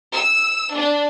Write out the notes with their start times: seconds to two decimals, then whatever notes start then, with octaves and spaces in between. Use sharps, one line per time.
0.14 E6
0.76 D4